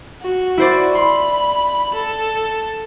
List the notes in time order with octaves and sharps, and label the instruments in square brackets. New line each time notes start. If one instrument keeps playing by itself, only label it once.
[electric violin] F#4
[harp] E4 C5 D5
[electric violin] B5 [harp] C6
[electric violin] A4